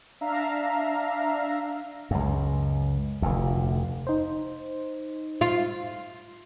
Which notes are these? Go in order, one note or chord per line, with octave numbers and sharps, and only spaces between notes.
D4 E5 F5 A#5
C#2 F#2
F1 D2
D#4 C5
F4